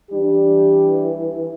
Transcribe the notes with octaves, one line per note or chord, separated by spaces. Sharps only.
E3 G3 D4 G4